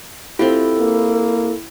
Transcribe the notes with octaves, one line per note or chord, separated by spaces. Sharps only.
C4 E4 F4 G4 A4
A#3